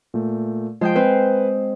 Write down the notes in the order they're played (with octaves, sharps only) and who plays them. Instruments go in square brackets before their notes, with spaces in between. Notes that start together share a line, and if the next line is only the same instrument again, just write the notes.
[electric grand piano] A#2 A3
[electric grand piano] F3 [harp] G#3 C5 G5
[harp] C4 [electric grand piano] B4